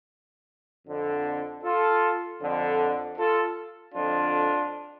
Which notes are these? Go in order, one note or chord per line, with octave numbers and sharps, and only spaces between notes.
F2 D3
F4 A4
F2 D3
F4 A4
F2 D3 D4 F4